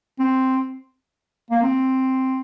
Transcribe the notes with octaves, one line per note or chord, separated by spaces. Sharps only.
C4
A#3
C4